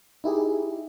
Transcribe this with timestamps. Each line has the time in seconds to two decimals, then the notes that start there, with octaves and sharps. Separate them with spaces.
0.24 D#4 E4 G4 G#4